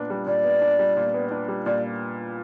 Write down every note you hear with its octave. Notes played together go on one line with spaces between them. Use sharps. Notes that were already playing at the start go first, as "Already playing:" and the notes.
Already playing: A#2 B3 D4
G3
A#2 D5
B3
D4
G3
A#2
B3
D4
G3
A#2 D5